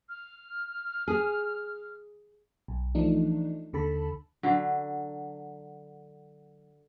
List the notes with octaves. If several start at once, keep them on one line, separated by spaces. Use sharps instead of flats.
F6
G#4
B1
E3 F3 A3 D4 D#4
D#2 D3 A4 A5 B5
D3 F#3